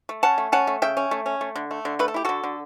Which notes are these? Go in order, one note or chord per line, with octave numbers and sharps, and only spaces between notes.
A3
C#4 F#5 A5
A3
C#4 F#5 A5
A3
C#3 E5 G5
C#4
A3
C#4
A3
D3
A3
D3
A3 B4
A4
E4 G4
D3 F#4 A4
D3